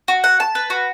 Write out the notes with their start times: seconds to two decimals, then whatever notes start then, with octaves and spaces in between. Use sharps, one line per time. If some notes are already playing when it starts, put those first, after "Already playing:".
0.08 F#4
0.24 F#5
0.40 A5
0.55 B4
0.70 F#4